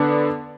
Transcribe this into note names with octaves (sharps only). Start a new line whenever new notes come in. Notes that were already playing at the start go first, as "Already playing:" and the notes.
Already playing: D3 B3 D4